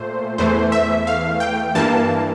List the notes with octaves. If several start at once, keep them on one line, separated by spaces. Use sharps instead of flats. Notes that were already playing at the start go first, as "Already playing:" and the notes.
Already playing: A#2 A3 C5
E2 E3 A3 C5
E5
F5
G5
G2 E3 A#3 A5